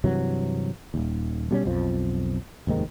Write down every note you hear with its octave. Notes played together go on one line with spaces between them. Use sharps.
G2 C3 E3 F#3
D#1 D#2
B2 G3 C#4
B1 F2 F3
F1 D#2 G#2 D#3